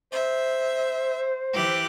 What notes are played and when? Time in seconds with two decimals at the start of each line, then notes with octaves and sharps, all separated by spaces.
0.13 C5 E5
1.54 E3 G4 F#6